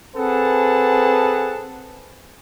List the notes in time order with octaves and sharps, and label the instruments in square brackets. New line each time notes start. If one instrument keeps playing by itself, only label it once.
[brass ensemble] C4 G#4 A4 B4 F#5 A5